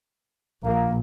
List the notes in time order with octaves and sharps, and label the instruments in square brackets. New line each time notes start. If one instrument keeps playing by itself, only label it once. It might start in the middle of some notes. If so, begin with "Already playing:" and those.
[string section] A#1 [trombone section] A#3